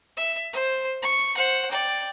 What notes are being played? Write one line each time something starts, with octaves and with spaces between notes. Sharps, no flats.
E5
C5
C#6
C5 F#5
D5 G5